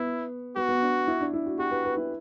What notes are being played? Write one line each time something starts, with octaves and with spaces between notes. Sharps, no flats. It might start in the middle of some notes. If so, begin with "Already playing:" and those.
Already playing: B3 E4
B3 F#4
B3
D4
E4
D4
E4
F#4
F#4 G4
B4
B4
E4